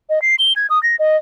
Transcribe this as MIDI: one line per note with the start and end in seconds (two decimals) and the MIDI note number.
0.10 0.22 75
0.22 0.35 96
0.39 0.53 103
0.56 0.67 92
0.70 0.81 87
0.83 0.96 94
0.99 1.17 75